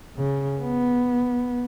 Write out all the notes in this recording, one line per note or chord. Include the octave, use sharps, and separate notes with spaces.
C#3
B3